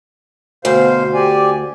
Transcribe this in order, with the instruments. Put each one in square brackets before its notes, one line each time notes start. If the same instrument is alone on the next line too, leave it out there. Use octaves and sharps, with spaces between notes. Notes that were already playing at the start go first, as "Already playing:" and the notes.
[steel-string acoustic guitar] D2 [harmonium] B2 C5 F5
[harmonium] G4 D5 G#5